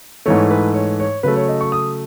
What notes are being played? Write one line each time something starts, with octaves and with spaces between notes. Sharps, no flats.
G#2 E3 A3 C#5
B4
C#5
C#5
C#3 F#3 A3 B4
C#5
D#5
C#6
D#6